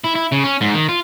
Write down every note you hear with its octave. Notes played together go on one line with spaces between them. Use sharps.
E4
E4
C#3
C#4
G#2
D#3
F4